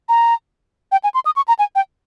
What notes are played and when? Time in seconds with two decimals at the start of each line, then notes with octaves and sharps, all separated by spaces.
0.09 A#5
0.92 G5
1.04 G#5
1.14 C6
1.26 D#6
1.36 C#6
1.48 A#5
1.59 G#5
1.75 G5